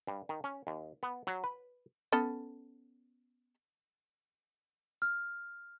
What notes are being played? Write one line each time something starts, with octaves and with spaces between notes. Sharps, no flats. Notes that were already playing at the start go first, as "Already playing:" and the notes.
G2
D#3
C#4
D#2
B3
F#3
B4
B3 C#4 A4
F6